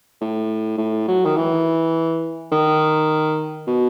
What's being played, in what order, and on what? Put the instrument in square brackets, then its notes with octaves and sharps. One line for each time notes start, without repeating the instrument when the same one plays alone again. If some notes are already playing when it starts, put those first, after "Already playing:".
[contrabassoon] A2
A2
F#3
D#3
E3
D#3
B2